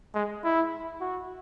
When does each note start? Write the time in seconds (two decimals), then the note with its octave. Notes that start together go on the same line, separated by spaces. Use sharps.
0.14 G#3
0.44 E4
1.00 F#4